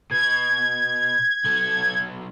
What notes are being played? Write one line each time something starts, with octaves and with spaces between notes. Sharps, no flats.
B2 G#6
B1 A4